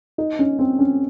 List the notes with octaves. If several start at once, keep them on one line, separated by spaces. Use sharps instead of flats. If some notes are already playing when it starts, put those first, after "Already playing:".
D#4
C#4
C4
C#4